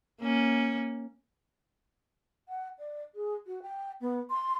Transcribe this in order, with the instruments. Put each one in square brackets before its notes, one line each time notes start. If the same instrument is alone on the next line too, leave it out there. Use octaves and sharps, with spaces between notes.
[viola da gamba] A#3 C#4
[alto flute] F#5
D5
G#4
F#4
G5
B3
C6